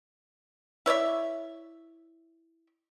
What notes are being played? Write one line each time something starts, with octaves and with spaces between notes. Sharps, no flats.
E4 C#5 D5 E5